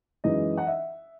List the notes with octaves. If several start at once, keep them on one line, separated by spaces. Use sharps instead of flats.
F#2 E3 G#3 D#4 D#5
F#5
E5